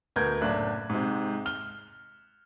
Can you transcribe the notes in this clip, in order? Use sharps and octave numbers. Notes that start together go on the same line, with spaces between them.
D2 B3 A#4 G6 G#6
F#1 A2 D4 F#6
G#2 C3
F6 G7